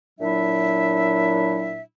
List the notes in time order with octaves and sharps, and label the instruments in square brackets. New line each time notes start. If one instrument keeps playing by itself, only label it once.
[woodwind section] A#2 F#3 D4 E4 E5